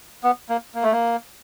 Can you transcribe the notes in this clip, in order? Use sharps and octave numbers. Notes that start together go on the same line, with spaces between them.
B3
A#3
A#3
A3
A#3